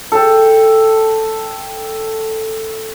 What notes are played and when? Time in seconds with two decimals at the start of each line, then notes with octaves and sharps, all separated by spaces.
0.12 A4 G5